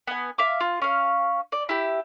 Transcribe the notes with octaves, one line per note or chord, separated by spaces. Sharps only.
B3 G#5
E5 F5 D6
F4
C#4 F5
D5
E4 G4